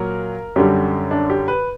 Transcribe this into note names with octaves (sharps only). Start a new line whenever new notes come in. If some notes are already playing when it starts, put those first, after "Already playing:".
Already playing: A#2 F#3 A#4
F#2 D3 G3 G4
D4
G4
B4